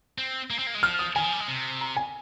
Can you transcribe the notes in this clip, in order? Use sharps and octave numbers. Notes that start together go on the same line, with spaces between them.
C4
A#3
C4
A#3
G#3
F3 F6
D#6
D#3 G#5
F3
G3
G#3
C3
A#5
G#5